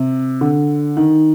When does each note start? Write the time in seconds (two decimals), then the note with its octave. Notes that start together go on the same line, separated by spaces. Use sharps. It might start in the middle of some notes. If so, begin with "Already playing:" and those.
Already playing: C3
0.41 D3
0.97 D#3